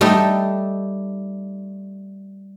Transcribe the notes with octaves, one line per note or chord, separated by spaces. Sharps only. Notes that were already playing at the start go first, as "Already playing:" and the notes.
G3 A3 D#4 G4 A4 E5